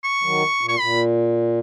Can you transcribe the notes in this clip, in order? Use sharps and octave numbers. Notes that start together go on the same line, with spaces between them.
C#6
D#3 F#3
A#2
C#6
A#2 B5